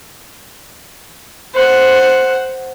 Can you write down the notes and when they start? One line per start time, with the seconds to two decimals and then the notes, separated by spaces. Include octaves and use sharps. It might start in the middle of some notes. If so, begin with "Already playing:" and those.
1.54 C5 F#5